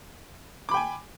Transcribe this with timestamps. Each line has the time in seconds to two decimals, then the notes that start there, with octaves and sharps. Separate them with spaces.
0.69 D6
0.71 B5
0.74 G5
0.76 G#5